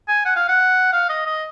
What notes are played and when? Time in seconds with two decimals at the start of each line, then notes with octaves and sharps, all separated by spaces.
0.08 G#5
0.25 F#5
0.36 F5
0.48 F#5
0.93 F5
1.09 D#5
1.26 D#5